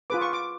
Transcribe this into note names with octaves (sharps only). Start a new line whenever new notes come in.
F4 G#4 B4 D6
C#6
D6